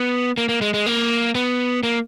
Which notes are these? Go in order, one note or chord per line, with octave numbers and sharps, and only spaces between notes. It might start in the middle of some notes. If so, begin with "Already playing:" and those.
Already playing: B3
A#3
A#3
G#3
G#3
A#3
B3
A#3